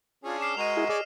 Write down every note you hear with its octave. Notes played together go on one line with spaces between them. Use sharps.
C#4 D4 F4 G#4
D6 F6 C7 E7
G#3 F#4 A#4 D#5 D#7 F7
E4 G#4
G#4 C#5 D5